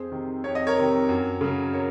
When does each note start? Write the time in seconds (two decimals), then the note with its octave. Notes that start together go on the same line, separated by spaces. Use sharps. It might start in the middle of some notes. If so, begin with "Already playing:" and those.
Already playing: F2 G#4 C5
0.12 C3 D#3
0.44 F2 C#5
0.55 D#5
0.67 A#4 C#5
0.77 C3 D#3
1.09 F#2
1.41 C#3 F#3
1.73 A#4 C#5